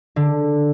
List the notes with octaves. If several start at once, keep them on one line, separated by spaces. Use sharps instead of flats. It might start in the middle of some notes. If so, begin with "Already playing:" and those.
D3